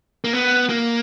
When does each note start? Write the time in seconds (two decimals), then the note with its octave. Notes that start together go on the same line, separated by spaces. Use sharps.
0.24 A#3
0.33 B3
0.69 A#3